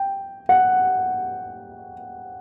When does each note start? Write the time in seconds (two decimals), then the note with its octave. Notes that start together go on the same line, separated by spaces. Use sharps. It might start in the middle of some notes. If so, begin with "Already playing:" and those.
Already playing: G5
0.49 F#5